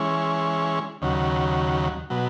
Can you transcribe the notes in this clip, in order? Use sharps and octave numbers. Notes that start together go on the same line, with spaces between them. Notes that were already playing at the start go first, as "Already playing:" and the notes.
Already playing: E3 G#3 C#4
D#2 C#3 F#3
B2 F#3